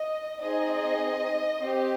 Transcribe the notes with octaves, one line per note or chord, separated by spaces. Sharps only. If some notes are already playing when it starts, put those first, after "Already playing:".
Already playing: D#5
C4 D#4 G#4 D#5
C4 G4